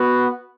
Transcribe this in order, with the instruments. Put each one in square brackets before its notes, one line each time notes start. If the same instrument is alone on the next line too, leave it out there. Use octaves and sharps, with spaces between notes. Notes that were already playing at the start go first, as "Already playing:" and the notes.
Already playing: [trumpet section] B3 F#4